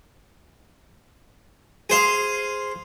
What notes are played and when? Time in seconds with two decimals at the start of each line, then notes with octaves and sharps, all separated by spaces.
1.90 G#4 C5 F5